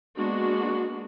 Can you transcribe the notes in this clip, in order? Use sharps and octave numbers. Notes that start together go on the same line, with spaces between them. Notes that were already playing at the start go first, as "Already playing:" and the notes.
G#3 A#3 B3 D4 F#4